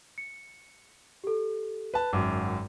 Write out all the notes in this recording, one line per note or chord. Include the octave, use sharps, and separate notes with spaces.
C#7
G4 A4
B4 A5
G#1 F#2 D6